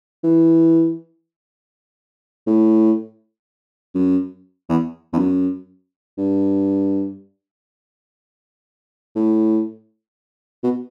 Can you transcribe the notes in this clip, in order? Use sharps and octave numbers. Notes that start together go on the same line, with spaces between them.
E3
A2
F#2
E2
E2
F#2
G2
A2
B2